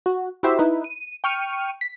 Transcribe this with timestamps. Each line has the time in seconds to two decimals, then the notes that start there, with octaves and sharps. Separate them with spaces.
0.06 F#4
0.43 E4 F#4 G4 C5 E5
0.59 D#4 E4 B4
0.84 D#7
1.24 G5 C#6 F6 C#7 D#7
1.81 B6